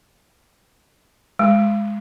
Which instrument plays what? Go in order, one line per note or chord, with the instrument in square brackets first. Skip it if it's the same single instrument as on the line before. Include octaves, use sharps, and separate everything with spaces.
[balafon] G#3